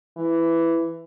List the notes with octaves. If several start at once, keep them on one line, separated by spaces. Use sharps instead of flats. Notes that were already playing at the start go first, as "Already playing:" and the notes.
E3